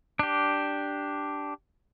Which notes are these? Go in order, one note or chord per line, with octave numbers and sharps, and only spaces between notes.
D4 G4